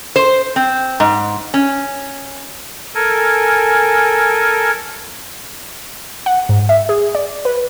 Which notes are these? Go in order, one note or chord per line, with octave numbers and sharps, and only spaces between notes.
C5
C4
G#2
C#4
A4 A#4 G#5
F#5
G#2
E5
G#4
D5
B4